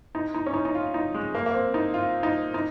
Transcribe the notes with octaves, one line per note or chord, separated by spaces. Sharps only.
D#4
D#4
C#4
D#4
D#4
F4
D#4
G#3
A#3
A#3
C4
D#4
F4
D#4
D#4